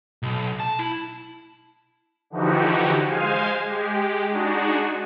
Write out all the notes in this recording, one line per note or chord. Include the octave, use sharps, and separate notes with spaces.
B1
A5
E4
D3 E3 F3 D#4 F#4 G4
G#3 C5 F5 G#5
G#3 G4
G#3 D4 D#4 F#4